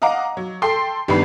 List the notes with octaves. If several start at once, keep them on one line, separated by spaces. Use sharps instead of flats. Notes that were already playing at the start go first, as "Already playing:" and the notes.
D#5 F5 F#5 A#5 D6
F#3
A4 G5 C6 C7
G#1 G2 G3 B3 B5 C7